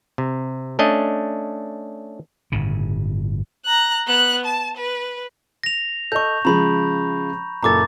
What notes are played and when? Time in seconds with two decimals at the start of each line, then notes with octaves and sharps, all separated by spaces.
0.18 C3
0.79 A3 C#4 D4 D#5
2.52 G1 A2 C#3
3.65 A#5 F#6
4.07 B3 F#6
4.45 A5
4.77 B4
5.63 A#6 F7
6.12 A4 D#5 C#6 G6
6.45 C#3 F3 G#3 A#5 B5
7.63 F#1 A#2 A4 A#5 D6 A6